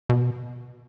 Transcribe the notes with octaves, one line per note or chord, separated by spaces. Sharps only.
B2